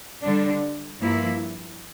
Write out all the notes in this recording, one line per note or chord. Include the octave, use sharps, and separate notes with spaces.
D3 G3 D4
G2 F3 A#3 E4